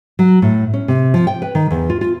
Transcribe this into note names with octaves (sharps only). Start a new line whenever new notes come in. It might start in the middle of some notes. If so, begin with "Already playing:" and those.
F#3
A2
C#4
C3
F3
G5
B4
D#3
E2
F4
F4